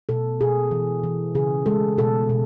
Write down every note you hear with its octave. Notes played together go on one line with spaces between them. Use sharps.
B2 A4
B2 G#4
E3
E3
C#3 G#4
G#3 A4
B2 A4
B2